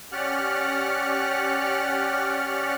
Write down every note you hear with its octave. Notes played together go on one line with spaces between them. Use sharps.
C#4 G4 D5 F#5 F6 F#6